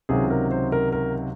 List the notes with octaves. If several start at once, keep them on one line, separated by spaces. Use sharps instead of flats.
C#2 C3 D#3 F#3 G#4
A#4
C5
A#4
A#4